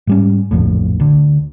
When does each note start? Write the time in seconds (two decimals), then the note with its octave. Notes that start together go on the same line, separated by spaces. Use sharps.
0.07 G#2 G3 C#4
0.51 D1 A#1 F2 A2
1.00 D2 D3